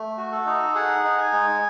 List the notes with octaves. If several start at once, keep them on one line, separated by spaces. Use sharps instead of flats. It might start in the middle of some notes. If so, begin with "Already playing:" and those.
Already playing: A3
F#4
A4
D#4
G#4 F#5
D#4
G#5
G#3